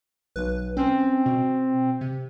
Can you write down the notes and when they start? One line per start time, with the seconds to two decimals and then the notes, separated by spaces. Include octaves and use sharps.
0.36 B1 B4
0.77 C4 C#4
1.26 B2
2.01 C3